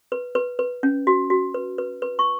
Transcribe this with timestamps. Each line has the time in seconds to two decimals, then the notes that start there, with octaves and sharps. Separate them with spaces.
0.12 B4
0.35 B4
0.59 B4
0.83 C#4
1.07 F#4
1.30 F#4
1.54 B4
1.78 B4
2.02 B4
2.19 C#6